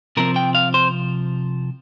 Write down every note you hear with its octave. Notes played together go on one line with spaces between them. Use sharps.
C3 F3 C4 A#4
G5
F5
C5